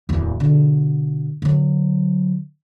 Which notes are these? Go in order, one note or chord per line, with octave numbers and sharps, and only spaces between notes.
D1 E2
B2 D3
D3 F#3